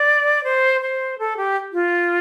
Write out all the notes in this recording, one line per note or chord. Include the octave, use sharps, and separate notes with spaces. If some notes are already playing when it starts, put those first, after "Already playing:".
Already playing: D5
C5
C5
A4
G4
F4